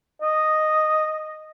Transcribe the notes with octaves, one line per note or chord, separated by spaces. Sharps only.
D#5